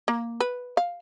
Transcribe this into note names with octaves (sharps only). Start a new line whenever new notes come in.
A#3
B4
F5